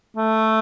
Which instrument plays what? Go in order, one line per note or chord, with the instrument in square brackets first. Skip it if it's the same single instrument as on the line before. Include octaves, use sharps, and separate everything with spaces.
[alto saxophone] A3